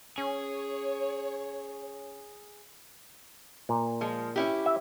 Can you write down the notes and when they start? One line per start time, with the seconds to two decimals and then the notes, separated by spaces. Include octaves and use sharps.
0.18 C#4 G#4 C#5
3.69 A#2
4.01 F3 G#3
4.36 C#4 E4 G4
4.66 E5